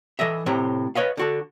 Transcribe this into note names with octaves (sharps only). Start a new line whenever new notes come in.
E3 A4 D#5 E5
A2 C3 C5 C#5 A#5
B4 C#5 D#5 F5
D3 F#4 A4